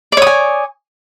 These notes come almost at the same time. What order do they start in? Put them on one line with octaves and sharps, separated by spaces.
D5 C#5 D#6 G#5